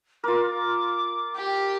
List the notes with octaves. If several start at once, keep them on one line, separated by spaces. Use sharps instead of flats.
F4 A#4 D6
G4